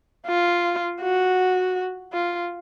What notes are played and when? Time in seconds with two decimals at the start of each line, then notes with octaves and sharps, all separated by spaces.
0.27 F4
1.01 F#4
2.13 F4